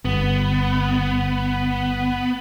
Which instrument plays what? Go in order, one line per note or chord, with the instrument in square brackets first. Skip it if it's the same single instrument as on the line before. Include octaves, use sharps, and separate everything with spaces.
[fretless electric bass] G1 [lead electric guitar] B3